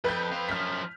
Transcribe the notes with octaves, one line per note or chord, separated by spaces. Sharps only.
F2 B4 G6
C4 F5
F#2 F3 F6 B6